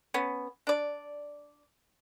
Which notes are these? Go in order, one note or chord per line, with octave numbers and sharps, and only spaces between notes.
B3 C#4
D4 D5